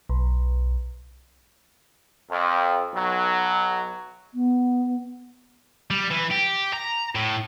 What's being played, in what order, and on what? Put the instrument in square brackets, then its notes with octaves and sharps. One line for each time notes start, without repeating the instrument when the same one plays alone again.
[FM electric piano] B1
[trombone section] F2
B1 F#3
[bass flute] B3
[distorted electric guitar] G3
E3
G4
A#5
A2